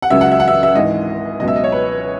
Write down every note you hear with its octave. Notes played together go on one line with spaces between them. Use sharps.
F#5
C#2 C#3 F#3 E5
F#5
E5
F#5
E5
E5
G#1 G#2 E3 D#5
C#2 B2 F#3 D#5
E5
D#5
C#5
B4